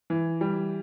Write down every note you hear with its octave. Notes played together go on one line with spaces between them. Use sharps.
E3
G3